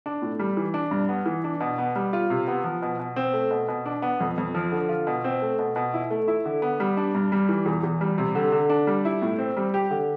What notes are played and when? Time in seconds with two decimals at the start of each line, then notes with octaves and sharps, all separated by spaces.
0.06 D4
0.22 A2
0.40 G3
0.57 E3
0.74 D4
0.91 G2
1.09 B3
1.26 E3
1.44 D4
1.60 B2
1.78 B3
1.96 G3
2.13 F4
2.30 C3
2.48 B3
2.64 F3
2.82 B2
2.99 B2
3.16 C4
3.33 A3
3.51 B2
3.68 B2
3.86 D4
4.02 B3
4.20 F2
4.38 F2
4.55 F3
4.72 D3
4.89 F4
5.07 B2
5.24 C4
5.42 A3
5.59 B2
5.76 B2
5.94 E4
6.11 A3
6.28 E4
6.45 D3
6.62 B3
6.80 G3
6.97 D4
7.15 G2
7.32 G3
7.49 E3
7.66 E2
7.83 E2
8.01 G3
8.18 C3
8.35 D3
8.52 D3
8.70 D4
8.87 G3
9.05 E4
9.22 A2
9.39 C4
9.57 G3
9.74 G4
9.91 D3